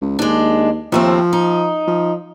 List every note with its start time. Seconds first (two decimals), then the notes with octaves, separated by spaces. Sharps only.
0.01 C#2
0.19 D#2 G#3 D4
0.92 D#2 F3 A3 C4
1.33 D#4
1.87 F3